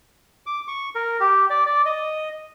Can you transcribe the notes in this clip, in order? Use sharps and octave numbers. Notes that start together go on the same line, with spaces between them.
D6
C#6
A#4
G4
D5
D5
D#5